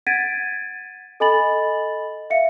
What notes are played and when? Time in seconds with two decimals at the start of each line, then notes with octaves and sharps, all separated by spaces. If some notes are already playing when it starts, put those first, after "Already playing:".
0.07 F#5 G#6 A6 B6 D7 D#7
1.20 A4 D#5 G#5 B5 A6 F#7
2.30 E5 F5 C#7